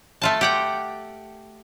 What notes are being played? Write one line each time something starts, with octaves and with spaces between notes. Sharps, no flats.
A3 F4 A5
G4 F#5 G5